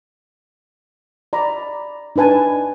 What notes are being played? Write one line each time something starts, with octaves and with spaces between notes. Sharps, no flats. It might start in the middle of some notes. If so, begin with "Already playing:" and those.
D5 A#5 B5
D4 D#4 B4 G#5 A5